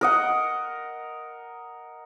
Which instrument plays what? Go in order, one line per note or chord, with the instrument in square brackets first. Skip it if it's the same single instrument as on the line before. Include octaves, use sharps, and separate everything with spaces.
[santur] A#4 D#5 F#5